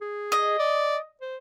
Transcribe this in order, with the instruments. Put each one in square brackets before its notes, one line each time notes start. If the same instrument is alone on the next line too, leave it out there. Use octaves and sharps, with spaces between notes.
[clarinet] G#4
[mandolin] D#5
[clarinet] D5
C5